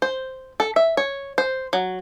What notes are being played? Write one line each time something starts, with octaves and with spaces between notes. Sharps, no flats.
C5
A4
E5
C#5
C5
F#3